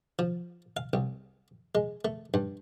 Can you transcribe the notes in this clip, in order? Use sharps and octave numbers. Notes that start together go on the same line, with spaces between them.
F3
F5
C2
G#3
A3
G2